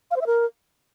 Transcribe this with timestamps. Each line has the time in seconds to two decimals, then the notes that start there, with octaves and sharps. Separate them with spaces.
0.11 F5
0.16 C5
0.21 E5
0.26 A#4